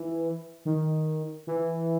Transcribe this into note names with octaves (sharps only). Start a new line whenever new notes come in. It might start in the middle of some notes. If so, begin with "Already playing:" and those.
Already playing: E3
D#3
E3